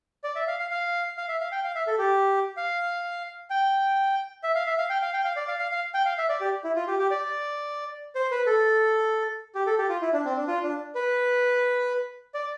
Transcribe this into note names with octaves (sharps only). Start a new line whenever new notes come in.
D5
E5
F5
F5
F5
F5
E5
F5
G5
F5
E5
A4
G4
F5
G5
E5
F5
E5
F5
G5
F5
G5
F5
D5
F5
F5
F5
G5
F5
E5
D5
G4
E4
F4
G4
G4
D5
C5
B4
A4
G4
A4
G4
F4
E4
D4
C4
D4
F4
D4
B4
D5